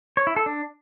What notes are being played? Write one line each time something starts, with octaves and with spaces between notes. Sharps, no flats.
C#5
E4
A4
D4